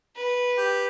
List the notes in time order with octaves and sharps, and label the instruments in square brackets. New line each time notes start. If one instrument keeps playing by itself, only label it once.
[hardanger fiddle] B4
[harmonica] G4